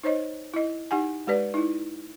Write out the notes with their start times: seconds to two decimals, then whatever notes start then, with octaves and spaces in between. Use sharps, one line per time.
0.04 D#4 C5 C#5 D#5
0.54 E4 D#5
0.91 D#4 G4 F#5 G#5
1.27 G#3 G4 B4 D5
1.54 D#4 E4